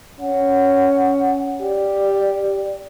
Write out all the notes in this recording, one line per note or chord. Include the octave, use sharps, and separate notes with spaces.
C#4 F#5
G4 D5